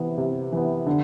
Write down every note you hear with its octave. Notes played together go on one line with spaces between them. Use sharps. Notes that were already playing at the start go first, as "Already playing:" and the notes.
Already playing: C3 E3 B3
C3
E3 B3
D3